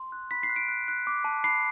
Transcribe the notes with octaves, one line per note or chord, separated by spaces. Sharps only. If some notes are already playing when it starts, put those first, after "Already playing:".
Already playing: C6
F#6
B5 B6
C7
F#6
D7
F#6
F#6
D6
A5
B5 C7